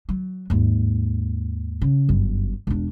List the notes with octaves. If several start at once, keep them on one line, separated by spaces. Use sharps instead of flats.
F#3
D#2 G#2
C#3
G1 F#2
E1 D4